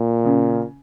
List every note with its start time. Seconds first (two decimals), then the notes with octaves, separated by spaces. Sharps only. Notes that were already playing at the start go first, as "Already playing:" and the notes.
Already playing: A#2
0.25 C#3